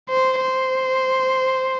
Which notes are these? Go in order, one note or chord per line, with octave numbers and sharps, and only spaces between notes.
C5
C5